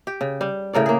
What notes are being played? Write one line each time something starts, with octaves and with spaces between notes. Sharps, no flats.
G4
C#3
G3
A2 C#3 A#4 D5
A#3 G#4